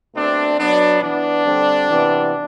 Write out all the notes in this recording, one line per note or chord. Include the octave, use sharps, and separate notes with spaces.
B2 A3 C4 D4
B2 F#3 B3 D4
E3 B3 D4
D3 G3 C4
C3 E3 B3